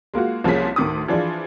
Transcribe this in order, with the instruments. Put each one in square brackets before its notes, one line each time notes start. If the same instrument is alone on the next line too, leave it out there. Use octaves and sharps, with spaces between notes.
[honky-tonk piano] G#3 A#3 F4 F#4
C2 F3 A#3 C#4 G#4 B6
D2 A2 D#3 D6 D#6
E3 F3 D4 F4 G#4